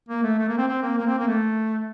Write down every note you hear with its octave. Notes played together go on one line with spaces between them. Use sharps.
A#3
A3
A3
A#3
C4
C4
A#3
A#3
C4
A#3
A3